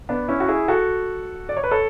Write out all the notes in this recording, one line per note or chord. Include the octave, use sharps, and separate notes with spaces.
B3 D4
C#4 E4
F#4
E4 G#4
F#4 A4
D5
C#5
B4
A4 C#5